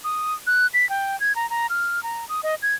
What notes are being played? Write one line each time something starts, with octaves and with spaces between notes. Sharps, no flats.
D#6
F#6
B6
G5
G#6
A#5
A#5
F6
A#5
D#6
D#5
G#6